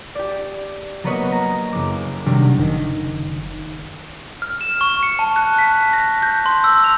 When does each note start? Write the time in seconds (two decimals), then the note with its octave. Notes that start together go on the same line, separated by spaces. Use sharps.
0.15 G4 D5
1.04 F#3 A#3 B3 B4 C#5 D#5
1.32 A#5
1.73 F#1 D6
2.26 C3 D#3 F#3 G3 D4
2.58 F#1 D#3
4.42 F6
4.61 E7
4.81 C#6
5.03 C#7
5.19 A5
5.36 F#6
5.59 B6
5.93 A#6
6.22 G6
6.46 C6
6.64 E6
6.84 F7